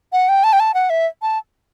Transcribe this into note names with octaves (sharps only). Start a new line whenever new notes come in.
F#5
G5
A5
G5
A5
F#5
E5
A5